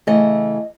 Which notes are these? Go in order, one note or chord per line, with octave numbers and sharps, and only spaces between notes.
C#3 E3 A3 D#5